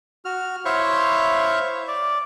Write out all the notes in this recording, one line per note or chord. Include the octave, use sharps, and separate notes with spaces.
F#4 F6
E4 C5 C#5 E5 F5 C#6
D5